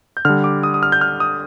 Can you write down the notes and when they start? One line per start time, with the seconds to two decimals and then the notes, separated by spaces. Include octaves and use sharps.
0.17 G6
0.25 D3 G3 F6
0.44 D6
0.63 D#6
0.74 D#6
0.83 F6
0.92 G6
1.01 F6
1.20 D#6